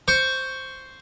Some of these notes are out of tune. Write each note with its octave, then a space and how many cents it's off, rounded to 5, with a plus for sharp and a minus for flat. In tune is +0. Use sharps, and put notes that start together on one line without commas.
C5 +0 C#6 +5